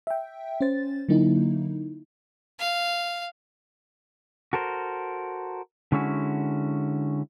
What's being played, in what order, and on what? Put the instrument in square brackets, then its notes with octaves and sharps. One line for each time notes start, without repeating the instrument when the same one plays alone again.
[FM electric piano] E5 G5
C#4 C5 A6
D3 F#3 A#3 D#4 E4
[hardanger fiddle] F5
[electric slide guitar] F#4 A4 A#4 C5
D3 G#3 C#4 E4 F#4